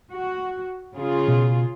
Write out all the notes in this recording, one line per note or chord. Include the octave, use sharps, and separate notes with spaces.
F#4
C#3 F4 G#4
B2